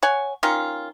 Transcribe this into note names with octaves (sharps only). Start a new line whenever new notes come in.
C#5 F#5 G#5
D#3 C#4 F4